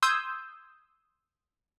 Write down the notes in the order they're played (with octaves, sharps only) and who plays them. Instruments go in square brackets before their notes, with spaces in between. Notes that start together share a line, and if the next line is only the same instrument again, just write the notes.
[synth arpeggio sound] C6 D#6 E6 G6 G#6